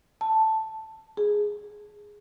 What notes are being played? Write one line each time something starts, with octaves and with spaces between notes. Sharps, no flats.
A5
G#4